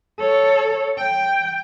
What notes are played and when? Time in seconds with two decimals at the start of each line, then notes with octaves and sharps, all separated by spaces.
0.20 A4 C#5
0.99 G5